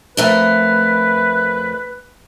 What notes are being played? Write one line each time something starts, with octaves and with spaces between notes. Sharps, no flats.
F2 A3 A#4 B4